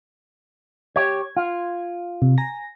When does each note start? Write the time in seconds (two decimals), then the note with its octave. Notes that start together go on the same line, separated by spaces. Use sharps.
0.96 G4 C#5 G#6
1.37 F4
2.22 C3
2.38 G#5 A#5 A#6